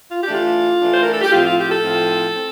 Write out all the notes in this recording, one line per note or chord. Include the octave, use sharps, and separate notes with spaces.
F4
G4
E3 A3 D4
F4
E3 A3 D4
C5
A#4
A4
G4
A2 F3 C4 F4
F4
G4
A4
A2 F3 C4
C4